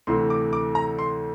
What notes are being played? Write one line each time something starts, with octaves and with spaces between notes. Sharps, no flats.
D2 C3 E3 A3 C6
D6
D6
A#5
C6